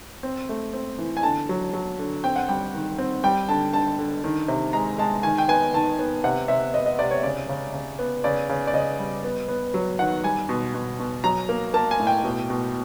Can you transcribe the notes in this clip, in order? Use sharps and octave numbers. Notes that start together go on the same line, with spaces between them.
C4
A3
C4
E3
G#5
D3 A5
F#3
F#3
D3
C4 G5
F#5
G3 G5
D#3
C4
G3 G5
D3 A5
D3 A5
D3
D#3
C3
G#3 A#5
G#3 A5
D#3 G#5
G5
B3 G#5
D#3 A5
B3
C3 F#5
C3 E5
B3 D#5
D#5
C3 D5
C#5
C#3 D5
C#3
C#3
B3
C#3 D5
C#3
D5
C#3 D#5
G3
B3
B3
F#3
D#3 F#5
G3 G#5
B2
B2
B2
F#3 A#5
A#3
A#3 A5
G#5
A2
G5
B2
B2